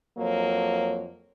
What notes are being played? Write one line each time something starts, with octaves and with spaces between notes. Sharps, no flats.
F2 F#3 A#3 C#5